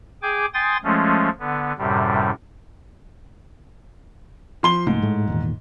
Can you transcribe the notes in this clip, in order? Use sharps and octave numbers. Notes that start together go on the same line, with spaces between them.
G#4 G5 G#5 D6
G5 G#5 C6 D#6 A6
F3 G#3 A3 C#4
D3 B3
F#2 A2 C3 G3
F3 C6 G7
C2 G#2 A3 A#3
A2 G#3 A3
E2 A#2 D#3